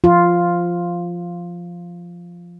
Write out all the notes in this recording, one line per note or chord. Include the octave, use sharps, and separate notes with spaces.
F3 F4